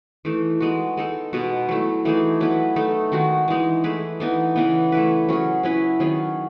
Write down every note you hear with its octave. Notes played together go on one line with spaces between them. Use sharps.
E3 A3 D#4
G#3 B3 F#4
G#3 D#4 A4
B2 G#3 B3 F#4
F#3 A3 E4
E3 A3 D#4 G#4
F#3 B3 E4 B4
A3 D#4 A4
D#3 G#3 D#4 F#4
E3 G#3 D#4
A3 E4 G#4 B4
E3 B3 D#4
C#3 E3 B3
A3 E4 B4
F#3 C#4 G#4
F#3 C#4 E4 B4
D#3 F#3 C#4 G#4